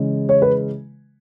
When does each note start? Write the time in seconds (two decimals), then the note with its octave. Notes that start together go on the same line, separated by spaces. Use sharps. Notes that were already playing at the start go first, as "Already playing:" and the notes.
Already playing: C#3 E3 G#3
0.29 C#5
0.42 B4